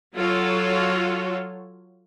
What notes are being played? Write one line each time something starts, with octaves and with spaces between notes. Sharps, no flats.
F#3 F4 F#4 A4 C#5